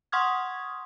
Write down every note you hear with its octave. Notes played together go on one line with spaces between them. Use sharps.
F#5 C6 C#6 D#6 F6 G#6